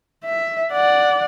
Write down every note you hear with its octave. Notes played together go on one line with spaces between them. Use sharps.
E5
D5 F#5